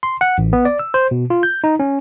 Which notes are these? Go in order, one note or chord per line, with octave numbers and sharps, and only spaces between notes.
C6
F#5
A1
B3
D5
E6
C5
B2
F4
G6
D#4
C#4